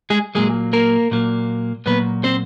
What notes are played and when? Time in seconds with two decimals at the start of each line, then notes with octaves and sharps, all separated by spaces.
0.10 G#3 G#4
0.35 A#2 F#3 G#3 A#3 G#4
0.73 A#3 A#4
1.11 A#2 F#3 A#3
1.86 A#2 F#3 A#3 B3 B4
2.24 C4 C5